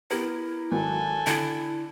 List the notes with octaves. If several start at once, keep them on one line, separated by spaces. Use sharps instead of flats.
B3 E4 G4 A#4
G#1 D#3 F#3 A4 G#5
D3 E4